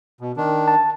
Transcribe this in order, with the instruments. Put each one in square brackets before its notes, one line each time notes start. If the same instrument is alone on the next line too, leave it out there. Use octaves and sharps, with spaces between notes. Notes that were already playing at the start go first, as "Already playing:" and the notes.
[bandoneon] B2
D#3 D4
[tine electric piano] A5